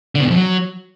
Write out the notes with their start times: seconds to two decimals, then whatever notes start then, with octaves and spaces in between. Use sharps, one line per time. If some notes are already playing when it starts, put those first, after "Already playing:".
0.15 D3
0.20 B2
0.26 E2
0.31 F2
0.36 F#3